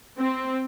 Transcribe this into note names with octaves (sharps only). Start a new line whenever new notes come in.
C4